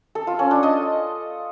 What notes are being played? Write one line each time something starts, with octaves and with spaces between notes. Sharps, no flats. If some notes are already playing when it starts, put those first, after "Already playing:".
A4
F4
C#4
D4
D#5